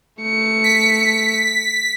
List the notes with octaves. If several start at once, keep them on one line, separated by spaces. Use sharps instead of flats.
A3 C#7
B6